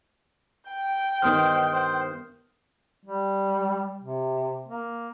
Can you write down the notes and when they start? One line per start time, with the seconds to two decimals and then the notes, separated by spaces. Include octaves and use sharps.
0.69 G5
1.22 G2 D#3 B3 C5 D#6 F6
1.72 C5
3.05 G3
4.01 C3
4.67 A#3